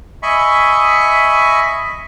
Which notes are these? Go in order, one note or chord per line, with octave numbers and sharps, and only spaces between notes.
D#5 E5 G#5 B5 C#6